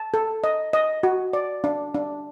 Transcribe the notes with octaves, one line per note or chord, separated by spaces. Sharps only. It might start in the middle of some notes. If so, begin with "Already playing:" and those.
Already playing: A5
A4
D#5
D#5
F#4
D5
D4
D4